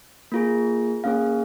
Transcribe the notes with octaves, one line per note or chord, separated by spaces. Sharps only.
A#3 F4 G#4
A#3 C#4 G#4 F5